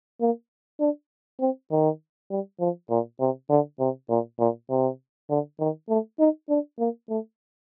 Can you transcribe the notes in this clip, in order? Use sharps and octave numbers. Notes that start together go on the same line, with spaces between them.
A#3
D4
C4
D#3
G3
F3
A#2
C3
D3
C3
A#2
A#2
C3
D3
D#3
A3
D#4
D4
A#3
A3